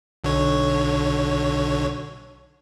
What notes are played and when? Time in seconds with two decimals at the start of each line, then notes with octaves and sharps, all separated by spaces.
0.24 B1 D3 C#5